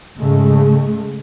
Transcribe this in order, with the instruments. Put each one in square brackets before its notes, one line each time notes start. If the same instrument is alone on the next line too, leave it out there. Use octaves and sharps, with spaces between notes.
[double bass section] G#2 C#3 G#3 A3